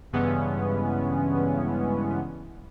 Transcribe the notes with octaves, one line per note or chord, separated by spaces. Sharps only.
G2 C#3 E3 G#3 B3 C#4